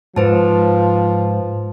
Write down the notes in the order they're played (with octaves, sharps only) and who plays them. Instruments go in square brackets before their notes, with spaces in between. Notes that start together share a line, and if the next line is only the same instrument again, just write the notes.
[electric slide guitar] G#2 [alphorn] F3 [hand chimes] B4 C5 A5